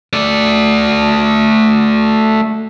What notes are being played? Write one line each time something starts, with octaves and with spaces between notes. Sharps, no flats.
A3 D5